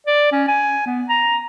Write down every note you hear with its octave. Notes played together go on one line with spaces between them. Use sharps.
D5
C#4
G#5
B3
A#5